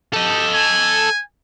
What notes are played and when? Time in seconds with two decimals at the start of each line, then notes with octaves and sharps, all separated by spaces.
0.13 G4 A4 D#5
0.54 G#5